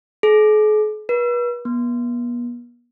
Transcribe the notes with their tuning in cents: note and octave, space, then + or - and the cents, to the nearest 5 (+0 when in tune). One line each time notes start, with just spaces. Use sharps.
G#4 +45
B4 -35
B3 -40